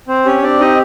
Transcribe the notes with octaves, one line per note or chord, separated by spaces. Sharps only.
C4 C5
C#4 G4 C#5
C4 D4 D5
D#4 G4 D#5